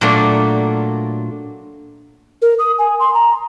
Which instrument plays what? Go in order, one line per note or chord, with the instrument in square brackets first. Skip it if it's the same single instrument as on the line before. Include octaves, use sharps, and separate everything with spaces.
[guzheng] A#2 F#3 A3 A#3 D4
[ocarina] A#4
D#6
G#5
C6
A#5